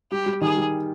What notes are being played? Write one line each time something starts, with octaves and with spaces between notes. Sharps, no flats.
G3 G4
G3
D#3 G#4
G3